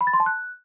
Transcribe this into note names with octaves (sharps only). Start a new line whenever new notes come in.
B5
A6
C6
A5
F#6